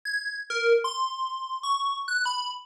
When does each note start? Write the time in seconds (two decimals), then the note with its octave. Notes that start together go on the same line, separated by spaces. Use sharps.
0.05 G#6
0.50 A#4
0.84 C6
1.63 C#6
2.08 F#6
2.26 B5